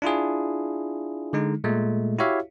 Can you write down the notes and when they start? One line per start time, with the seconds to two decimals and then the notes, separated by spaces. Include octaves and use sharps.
0.02 D4 E4 F4 G#4
1.33 D3 G#3 D#4
1.64 A#2 G#3 A3
2.19 E4 F#4 G4 C#5 E5 F5